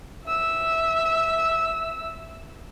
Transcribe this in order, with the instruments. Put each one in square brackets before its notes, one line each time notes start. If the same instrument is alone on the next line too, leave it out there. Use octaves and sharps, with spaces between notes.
[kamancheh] E5 E6